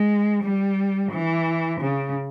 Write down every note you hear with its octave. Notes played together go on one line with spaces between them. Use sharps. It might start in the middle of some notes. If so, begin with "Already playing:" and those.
Already playing: G#3
G3
E3
C#3